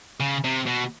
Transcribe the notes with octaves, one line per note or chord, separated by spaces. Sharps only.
C#3
C3
B2